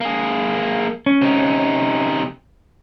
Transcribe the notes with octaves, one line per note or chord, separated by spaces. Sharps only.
A#3 G#4
C#4
C3 D#4